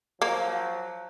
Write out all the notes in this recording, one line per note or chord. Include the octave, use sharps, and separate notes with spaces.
F3 F#3 A#3